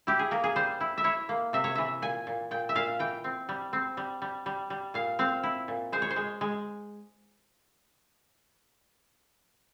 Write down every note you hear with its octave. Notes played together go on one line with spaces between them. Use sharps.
E4 G4
G#4
A#3 A#4
G#4
G3 C5
E4
E5
E4 C#5
A#3
C3 E5
C#5
E3 E5
A#2 G#5
A#2
A#2 G5
E5
A#2 F5
E3 G5
C4
G3
C4
G3
G3
G3
G3
A#2 F5
C4 F5
E4
A#2
G#3 C5
C#5
C5
G#3
G#3